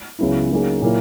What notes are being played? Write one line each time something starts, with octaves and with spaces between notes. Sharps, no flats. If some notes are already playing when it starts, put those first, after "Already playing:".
C#2 C#3 F#3 B3 E4
C#3 F#3 A#3 D#4 G#4
A#2 F#3 A#3 E4